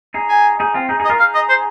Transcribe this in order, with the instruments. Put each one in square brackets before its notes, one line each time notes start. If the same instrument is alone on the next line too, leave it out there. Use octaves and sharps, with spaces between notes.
[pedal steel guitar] D#4 G#4
[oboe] G#5
[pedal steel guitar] D#4 G#4
C4 F4
D#4 G#4
D#4 G#4
[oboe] D#5
[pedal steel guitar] F4 A#4
[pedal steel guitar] D#4 G#4 [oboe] F5
[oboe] D#5
C5